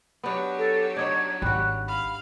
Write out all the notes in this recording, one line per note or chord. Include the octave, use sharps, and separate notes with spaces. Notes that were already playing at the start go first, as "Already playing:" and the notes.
F#3 B3 D4 G4
A4
D4 D#4 C#5 G#6
G#1 G3 F#4 F#6
F5 B5